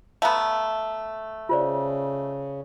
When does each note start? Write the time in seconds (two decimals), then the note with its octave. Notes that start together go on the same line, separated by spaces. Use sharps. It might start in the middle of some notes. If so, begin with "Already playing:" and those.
0.22 A3 B3 F5 A#5
1.49 C#3 F4 C5 D5